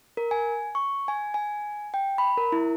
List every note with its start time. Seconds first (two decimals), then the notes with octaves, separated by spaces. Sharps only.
0.17 A#4
0.31 G#5
0.75 C#6
1.08 G#5
1.34 G#5
1.94 G5
2.18 B5
2.38 A#4
2.52 E4